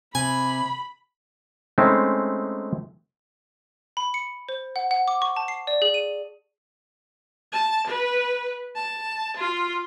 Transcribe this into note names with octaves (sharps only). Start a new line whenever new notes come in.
C3 G#5 B5
G#3 A3 C4 C#4 D#4 E4
B5
C#7
C5
F#5
F#5
D6
C#6
A5
C7
D5
G#4
D#7
A5
B4
A5
F4